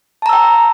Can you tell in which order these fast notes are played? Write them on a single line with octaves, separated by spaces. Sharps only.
A5 A#5 E6 G5